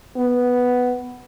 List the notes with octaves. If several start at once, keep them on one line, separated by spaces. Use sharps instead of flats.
B3